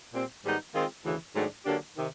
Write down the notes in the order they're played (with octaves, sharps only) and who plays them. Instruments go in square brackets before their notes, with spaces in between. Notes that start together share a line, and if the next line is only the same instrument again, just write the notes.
[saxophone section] A#2 G3 C4
G#2 D#3 G3 B3 D#4
D#3 G#3 C4 F4
D2 C#3 E3
G#2 D#3 F#3 A3 D4
D3 F#3 A#3 D4 G4
C3 D#3